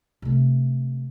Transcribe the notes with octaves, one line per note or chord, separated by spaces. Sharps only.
C3 A3